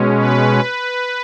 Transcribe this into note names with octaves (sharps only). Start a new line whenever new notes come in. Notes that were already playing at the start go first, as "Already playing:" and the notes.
Already playing: B2 G#3 C#4
B4